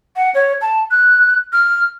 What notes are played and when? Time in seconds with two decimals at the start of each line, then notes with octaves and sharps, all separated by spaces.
0.16 F#5
0.34 C#5
0.61 A5
0.91 F#6
1.53 F6